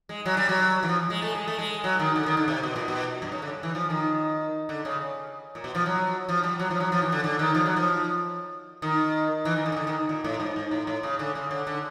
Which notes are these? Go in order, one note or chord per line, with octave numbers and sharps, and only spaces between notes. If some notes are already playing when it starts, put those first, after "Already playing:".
G#3
F#3
G3
F#3
E3
F3
G#3
A3
G#3
A3
G#3
F#3
D#3
D3
D#3
D3
C3
B2
A#2
B2
G2
C#3
D3
E3
F3
D#3
D3
C#3
A#2
B2
F3
F#3
F3
G3
F#3
F3
F#3
F3
E3
D3
D3
D#3
F3
F#3
F3
D#3
E3
D#3
D3
D#3
D3
D#3
A#2
A2
G#2
G#2
A2
A2
C#3
D3
C#3
D3
D3